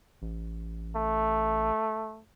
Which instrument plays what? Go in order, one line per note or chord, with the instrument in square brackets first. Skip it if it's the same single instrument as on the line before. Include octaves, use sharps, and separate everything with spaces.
[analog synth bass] A1
[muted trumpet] A3